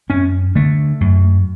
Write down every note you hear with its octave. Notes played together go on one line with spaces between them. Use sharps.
F#2 C#4
D3 A3
F#2